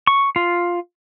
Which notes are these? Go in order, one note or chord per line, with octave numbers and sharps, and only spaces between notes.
C#6
F4